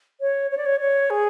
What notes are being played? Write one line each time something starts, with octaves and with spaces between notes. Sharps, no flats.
C#5
C#5
D5
C#5
C#5
G#4